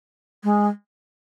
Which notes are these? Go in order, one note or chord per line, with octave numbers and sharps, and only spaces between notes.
G#3